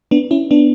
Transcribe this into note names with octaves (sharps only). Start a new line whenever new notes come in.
B3 D4
C#4 E4
B3 D4